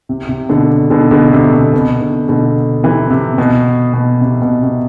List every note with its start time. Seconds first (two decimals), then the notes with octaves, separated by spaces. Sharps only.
0.09 C3
0.29 C3
0.49 B2 D3
0.90 B2 D3
1.11 B2 D3
1.33 C3
1.53 B2
1.73 B2
2.00 B2 D3
2.29 B2 D3
2.83 C3 E3
3.10 C3
3.38 B2
3.93 B2
4.21 C3
4.42 B2
4.62 C3